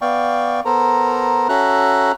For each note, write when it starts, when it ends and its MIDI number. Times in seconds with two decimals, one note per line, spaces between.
0.01 0.60 59
0.01 0.60 74
0.01 0.60 77
0.01 0.60 79
0.01 0.60 85
0.65 1.48 59
0.65 1.48 69
0.65 1.48 70
0.65 1.48 72
0.65 1.48 82
1.49 2.12 61
1.49 2.12 66
1.49 2.12 69
1.49 2.12 76
1.49 2.12 82
1.49 2.12 90